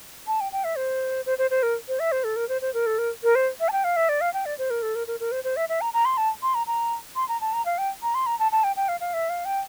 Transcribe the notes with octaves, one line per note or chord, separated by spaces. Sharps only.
A5
G5
G5
E5
C5
C5
C5
C5
A#4
C5
E5
C5
A4
A#4
C5
C5
A#4
A4
A#4
A#4
C5
E5
A5
G5
F5
E5
D5
F5
G5
D5
C5
A#4
A4
A#4
A#4
A#4
C5
C5
E5
E5
A#5
A#5
C6
A5
C6
A#5
A#5
C6
A#5
A5
A#5
F5
G5
A#5
C6
A#5
A5
A5
G5
G5
F5
F5
E5
F5
G5